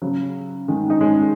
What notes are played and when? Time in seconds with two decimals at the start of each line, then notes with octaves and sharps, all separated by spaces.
0.02 C#3 F#3
0.68 D#3 G#3
0.90 D#4
1.01 G#3 C#4